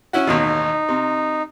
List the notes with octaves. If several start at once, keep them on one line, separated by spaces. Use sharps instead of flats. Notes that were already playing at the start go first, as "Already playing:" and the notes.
C#4 E4 F#4
A1 D#2 B2 D#4
C3